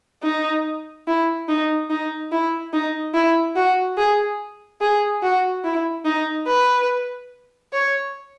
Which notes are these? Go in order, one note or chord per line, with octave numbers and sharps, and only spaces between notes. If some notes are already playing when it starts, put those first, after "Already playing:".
D#4
E4
D#4
D#4
E4
D#4
E4
F#4
G#4
G#4
F#4
E4
D#4
B4
C#5